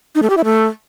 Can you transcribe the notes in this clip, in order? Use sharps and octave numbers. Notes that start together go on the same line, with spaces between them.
D#4
A3
G4
E4
A3